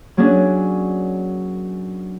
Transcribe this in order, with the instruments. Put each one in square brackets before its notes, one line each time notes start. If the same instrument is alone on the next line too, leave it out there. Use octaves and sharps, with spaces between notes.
[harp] F#3 A#3 C#4 D4 G#4